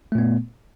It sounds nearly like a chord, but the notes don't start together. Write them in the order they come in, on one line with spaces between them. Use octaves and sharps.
A3 A#2 B3